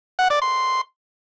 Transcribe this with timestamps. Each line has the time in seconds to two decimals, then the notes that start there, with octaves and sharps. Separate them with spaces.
0.19 F#5
0.30 D5
0.42 C6